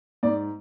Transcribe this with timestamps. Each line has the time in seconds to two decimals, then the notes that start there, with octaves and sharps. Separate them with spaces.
0.23 G#2 D5